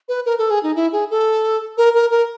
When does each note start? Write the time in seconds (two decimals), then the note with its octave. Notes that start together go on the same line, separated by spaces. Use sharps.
0.08 B4
0.26 A#4
0.39 A4
0.50 G#4
0.63 D#4
0.76 E4
0.92 G#4
1.10 A4
1.78 A#4
1.94 A#4
2.11 A#4